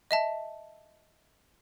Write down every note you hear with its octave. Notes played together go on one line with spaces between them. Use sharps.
D#5 E5 A5